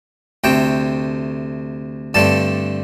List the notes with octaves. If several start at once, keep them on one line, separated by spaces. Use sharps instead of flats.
D2 C3 A3 C4 G5
G2 D3 A3 C4 A5